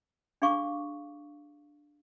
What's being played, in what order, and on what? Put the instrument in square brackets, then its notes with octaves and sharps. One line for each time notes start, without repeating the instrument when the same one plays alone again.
[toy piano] D4 G4 G#4 F5 C#6 D6